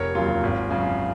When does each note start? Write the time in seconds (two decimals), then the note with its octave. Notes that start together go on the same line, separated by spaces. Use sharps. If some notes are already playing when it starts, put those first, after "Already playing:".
Already playing: F1 A#4 C#5
0.15 D#2 C#3 F#3 F4
0.43 G#1
0.70 F#2 C#3